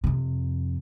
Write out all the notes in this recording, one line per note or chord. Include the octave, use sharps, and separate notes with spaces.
F2 C3